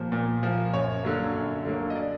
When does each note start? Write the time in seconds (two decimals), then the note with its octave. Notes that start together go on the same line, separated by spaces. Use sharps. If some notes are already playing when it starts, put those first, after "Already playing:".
Already playing: A#2 F3 A#3
0.12 A#2
0.43 F3 A#3
0.73 F#2 C#5
1.03 D3 F#3 A#3
1.34 F#2
1.65 D3 F#3 A#3
1.90 D#5
1.95 D5